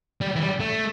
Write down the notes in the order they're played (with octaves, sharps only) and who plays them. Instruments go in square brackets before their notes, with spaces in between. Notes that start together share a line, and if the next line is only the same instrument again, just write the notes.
[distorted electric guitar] G3
E3
G3
A3